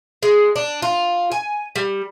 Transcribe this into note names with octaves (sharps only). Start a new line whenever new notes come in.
G#3
D4
F4
G#5
G3